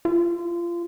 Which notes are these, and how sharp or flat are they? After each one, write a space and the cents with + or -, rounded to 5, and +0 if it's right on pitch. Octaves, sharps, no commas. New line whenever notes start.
F4 -25